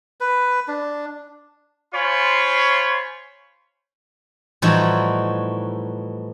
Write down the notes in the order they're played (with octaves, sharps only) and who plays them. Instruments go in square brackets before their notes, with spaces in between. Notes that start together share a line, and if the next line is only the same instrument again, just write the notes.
[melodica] B4
D4
[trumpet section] F4 C5 C#5 G#5 B5 C6
[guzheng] A2 E3 F3 G3 D#4 F#4